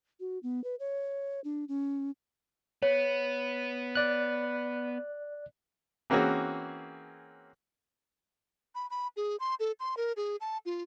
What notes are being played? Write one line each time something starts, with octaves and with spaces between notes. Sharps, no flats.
F#4
B3
B4
C#5
D4
C#4
B3 C#5
D5 F#6
E3 A#3 C4 C#4 F#4 G#4
B5
B5
G#4
C6
A4
C6
A#4
G#4
A5
F4